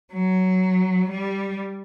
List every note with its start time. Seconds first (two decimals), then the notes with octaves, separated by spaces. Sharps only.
0.13 F#3
1.10 G3